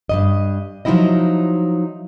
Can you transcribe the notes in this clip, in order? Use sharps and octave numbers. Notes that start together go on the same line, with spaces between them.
G2 B2 D#5
F3 F#3 C#4 D#4 E4 D#5